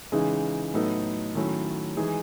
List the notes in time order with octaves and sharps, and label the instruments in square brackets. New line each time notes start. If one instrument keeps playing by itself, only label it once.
[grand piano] C#3 E3 G#3 D#4
A2 F#3 B3 D#4 A4
D#3 F#3 A3 C#4 E4
E3 G#3 D#4 G#4